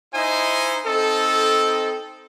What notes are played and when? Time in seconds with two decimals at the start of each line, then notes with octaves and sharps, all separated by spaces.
0.14 D#4 E4 C5 D#5 G#5
0.86 C4 D#4 A4